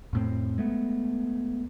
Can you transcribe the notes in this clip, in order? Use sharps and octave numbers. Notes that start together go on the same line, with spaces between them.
F2 A2 C4
G#3 A3 B3